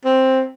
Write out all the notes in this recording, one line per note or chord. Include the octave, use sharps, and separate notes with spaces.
C4